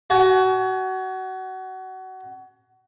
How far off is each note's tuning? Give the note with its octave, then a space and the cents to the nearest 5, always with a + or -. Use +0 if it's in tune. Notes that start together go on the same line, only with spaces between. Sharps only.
F#4 +25 G#5 +30